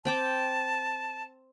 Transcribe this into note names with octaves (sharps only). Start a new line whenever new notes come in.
C4 G5 A5 D6